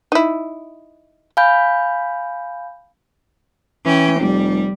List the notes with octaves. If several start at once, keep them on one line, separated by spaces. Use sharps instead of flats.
D#4 E4
F5 G#5 B5 G6
E3 C#4 G5
F1 G3